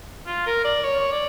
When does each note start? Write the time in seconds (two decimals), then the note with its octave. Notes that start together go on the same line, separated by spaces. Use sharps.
0.27 F4
0.46 A#4
0.64 D5
0.83 C#5
1.12 D5